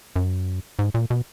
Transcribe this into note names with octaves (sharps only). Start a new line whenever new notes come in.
F#2
G#2
A#2
B2